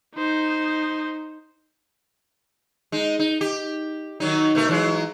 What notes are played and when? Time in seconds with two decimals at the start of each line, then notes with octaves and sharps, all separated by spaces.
0.14 D#4 C5
2.92 G#3 D#4
3.19 D#4
3.41 G4
4.20 D#3 F#3 D#4
4.55 B2 A3 A#4
4.69 E3 F#3 G#3